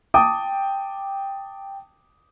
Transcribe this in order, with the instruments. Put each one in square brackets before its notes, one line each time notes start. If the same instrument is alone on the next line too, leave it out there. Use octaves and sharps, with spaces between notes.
[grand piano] G5 A5 D6 D#6